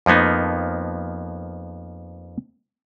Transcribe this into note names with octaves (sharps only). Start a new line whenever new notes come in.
F2 F3 A#3 B3 D#4